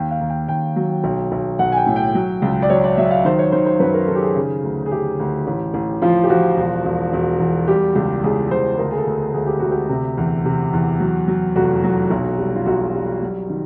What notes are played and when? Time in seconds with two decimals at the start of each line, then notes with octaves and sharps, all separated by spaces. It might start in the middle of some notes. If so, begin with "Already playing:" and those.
Already playing: D#2 G5
0.11 F5
0.21 D#2
0.30 G5
0.48 D#2 G5
0.76 F#3
1.04 B1
1.32 B1
1.59 B1 F#5
1.72 G#5
1.77 G5
1.86 A2
1.96 G5
2.15 F#3
2.42 C#2
2.62 D5
2.70 F#3 C#5
2.84 D5
2.98 F#3 E5
3.11 F5
3.25 D#3 C5
3.39 C#5
3.52 D#3 C5
3.66 C5
3.80 F#2 B4
3.94 A#4
4.08 D#3 A4
4.15 G4
4.22 G#4
4.36 C#3
4.63 D2
4.86 G#4
4.91 C#3 G4
5.20 D2
5.47 A1
5.74 A1
6.02 F3 F4
6.24 G4
6.30 F3 F#4
6.57 E1
6.85 E1
7.13 E1
7.40 E2
7.67 G3 G4
7.95 C#2 G4
8.24 C#2 G#4
8.51 C#2 C5
8.78 D2 A#4
8.91 G#4
8.97 A4
9.06 D2
9.34 D2 G#4
9.47 G4
9.59 D2 F#4
9.71 G4
9.89 C3
10.17 E2
10.45 C3
10.73 E2
11.00 F#3
11.28 F#3
11.56 F1 F#4
11.84 F#3
12.10 B1
12.38 G3
12.56 F4
12.66 B1 F#4
12.94 G3
13.22 F#3
13.50 D#3